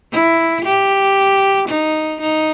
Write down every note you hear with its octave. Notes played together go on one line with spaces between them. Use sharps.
E4
G4
D#4
D#4